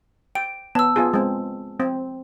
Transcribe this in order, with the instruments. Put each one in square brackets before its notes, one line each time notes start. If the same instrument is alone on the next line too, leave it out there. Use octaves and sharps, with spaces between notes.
[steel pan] G5 [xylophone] D7
[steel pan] B3 [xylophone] A5 E6
[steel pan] B3 F4 G#4
G#3 C4
C4